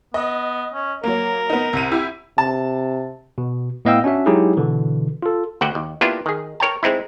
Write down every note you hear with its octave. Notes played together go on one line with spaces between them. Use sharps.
B3 D#5
C#4
F#3 A#3 A#4
B3 D#4
C2 D#7
E4 G4
C3 A5
B2
A2 B3 D#5 F5 G5 E6
C#4 D4 F#4 E5
F#3 G#3 D#4 E4 G4 G#4
B2 D3 E3
F4 A4
D2 D3 F#4 F#5 G5
D#2
A#3 B3 D4 E4 F4 G4
D#3 G#4
A#4 C#5 G5 A5
G#3 C4 D#4 E4